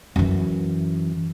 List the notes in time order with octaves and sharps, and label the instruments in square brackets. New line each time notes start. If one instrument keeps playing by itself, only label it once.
[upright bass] F#2 E3